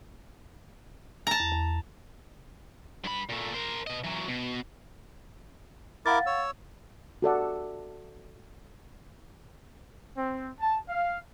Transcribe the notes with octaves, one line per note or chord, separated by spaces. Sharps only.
A5 A#5
E2
E2
G2 B5
A#2 A3
A#4 C5
B2 D#5
E3 F#3
B2
E4 A#4 F5 F#5 D6 A6
C#5 E6
F#4 A4 D5 F#5
C4
A5
F5